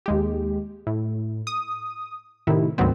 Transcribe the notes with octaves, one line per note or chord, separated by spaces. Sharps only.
D#2 G#3 G4
A2
D#6
A2 C3 D#3 E4
D2 G#2 D#3 F#3 B3 C4